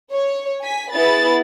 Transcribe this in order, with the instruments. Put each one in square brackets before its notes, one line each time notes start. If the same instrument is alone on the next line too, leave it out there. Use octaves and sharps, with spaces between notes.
[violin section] C#5
G#5 B6
B3 E4 G#4 B4 A6